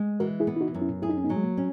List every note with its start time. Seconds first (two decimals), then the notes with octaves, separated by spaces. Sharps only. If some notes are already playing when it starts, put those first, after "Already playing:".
Already playing: G#3
0.20 E3 F#4 A#4
0.40 E4 G#4
0.47 B3
0.57 E4
0.61 D#4 F#4
0.74 F#2
0.82 C#4 E4
1.02 E4 G#4
1.09 D#4
1.17 C#4
1.24 B3 D#4
1.30 F#3
1.36 G#3
1.44 A#3
1.57 C#4